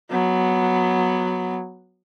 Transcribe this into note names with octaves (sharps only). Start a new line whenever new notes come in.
F#3 B3